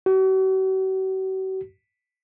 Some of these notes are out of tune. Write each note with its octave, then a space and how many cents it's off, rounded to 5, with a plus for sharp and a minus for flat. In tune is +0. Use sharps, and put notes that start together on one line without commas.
F#4 +45